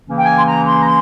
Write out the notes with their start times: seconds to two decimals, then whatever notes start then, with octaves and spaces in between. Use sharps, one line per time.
0.06 C#3 E3 A#3 C#4
0.18 G5
0.26 G#5
0.39 C6
0.46 A#5
0.66 C6
0.82 A#5
0.86 C6